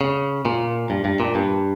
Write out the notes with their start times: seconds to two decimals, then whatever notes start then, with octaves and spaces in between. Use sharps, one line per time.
0.01 C#3
0.45 A#2
0.90 G2
1.05 G2
1.20 A#2
1.35 G2